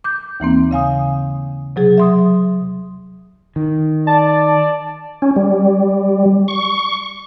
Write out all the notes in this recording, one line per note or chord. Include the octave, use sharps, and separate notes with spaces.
D6 G6
D#2 E3 A#3 C4
C#3 F5 G#5 D#6
C3 F#3 G#4
E5 C6 D#6
D#3
D5 A5
C#4
G3
C#6